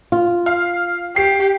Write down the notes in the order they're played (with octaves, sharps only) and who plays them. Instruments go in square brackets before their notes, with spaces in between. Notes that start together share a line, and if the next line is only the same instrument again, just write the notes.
[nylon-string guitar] F4
[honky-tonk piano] F5
[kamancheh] G4 [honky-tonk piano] C7